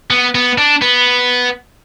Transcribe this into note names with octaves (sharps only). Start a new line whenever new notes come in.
B3
B3
D4
B3